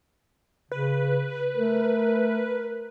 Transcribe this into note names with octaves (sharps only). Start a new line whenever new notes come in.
C#3 B4
A3 A#4